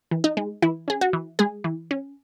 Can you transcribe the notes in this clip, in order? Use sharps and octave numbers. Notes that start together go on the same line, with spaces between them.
E3
D#4
G#3
E3 E4
C#4 G#4
F#4
E3
G#3 G#4
E3
C#4